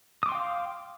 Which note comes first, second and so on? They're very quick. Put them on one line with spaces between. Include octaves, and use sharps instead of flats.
D#6 D6 C6 G5 F5